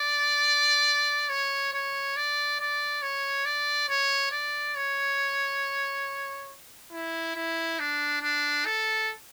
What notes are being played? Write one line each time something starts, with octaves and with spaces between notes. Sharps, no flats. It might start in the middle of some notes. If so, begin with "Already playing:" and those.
Already playing: D5
C#5
C#5
D5
D5
C#5
D5
C#5
D5
C#5
E4
E4
D4
D4
A4